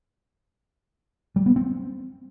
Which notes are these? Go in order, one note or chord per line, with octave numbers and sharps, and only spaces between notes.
G3
B3
C4